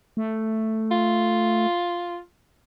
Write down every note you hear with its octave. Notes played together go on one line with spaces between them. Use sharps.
A3
F4